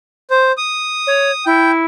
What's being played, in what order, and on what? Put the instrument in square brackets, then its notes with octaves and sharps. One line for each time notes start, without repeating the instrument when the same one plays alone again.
[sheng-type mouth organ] C5
D#6
[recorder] C#5
[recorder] E4 [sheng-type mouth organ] G5